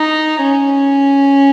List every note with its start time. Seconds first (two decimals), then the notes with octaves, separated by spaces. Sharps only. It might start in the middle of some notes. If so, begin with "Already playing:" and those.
Already playing: D#4
0.42 C#4